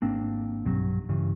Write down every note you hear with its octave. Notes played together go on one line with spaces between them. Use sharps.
G#1 A#3 C4 D4
B1 G2 F#3
G2 C#3 E3